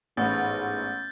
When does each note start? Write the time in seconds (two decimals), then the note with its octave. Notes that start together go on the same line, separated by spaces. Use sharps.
0.17 A1 G#2 B3 F6 G6 A6